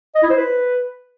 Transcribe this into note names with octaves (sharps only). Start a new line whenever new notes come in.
D#5
E4
C5
B4